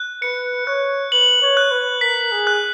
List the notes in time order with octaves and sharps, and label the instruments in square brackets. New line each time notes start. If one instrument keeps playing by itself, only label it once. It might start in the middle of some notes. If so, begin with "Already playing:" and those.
Already playing: [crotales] F#6
[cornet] B4 [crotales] C#7
[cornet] C#5 [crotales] F#6
[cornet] B4 [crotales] F#7
[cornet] C#5
[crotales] F#6
[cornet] B4
[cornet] A#4 [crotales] B6
[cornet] G#4
[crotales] F#6